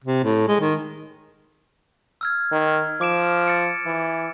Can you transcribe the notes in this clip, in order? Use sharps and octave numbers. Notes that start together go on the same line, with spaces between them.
C3
A2
G#3
D#3
E6 F6 G#6
D#3
F3 D6 D7 E7
A6 C#7 D7
E3